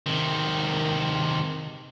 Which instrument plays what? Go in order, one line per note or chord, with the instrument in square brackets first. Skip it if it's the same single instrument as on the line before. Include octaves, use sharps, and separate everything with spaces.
[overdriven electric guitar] C3 D#3